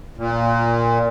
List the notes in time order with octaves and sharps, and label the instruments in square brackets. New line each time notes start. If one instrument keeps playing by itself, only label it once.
[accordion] A#2